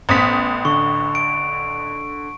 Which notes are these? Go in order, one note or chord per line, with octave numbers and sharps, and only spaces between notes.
A1 B3 C5 D#6 B6
D3 C#6
D7